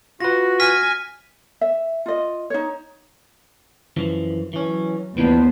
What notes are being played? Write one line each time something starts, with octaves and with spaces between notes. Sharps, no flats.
F4 F#4 B4 A#6
G#5 F6 B6
E5
F4 D#5
D#4 C#5
F#2 E3 F3
E3 F#3 C#4
D#2 E3 F3 B3 D4 C5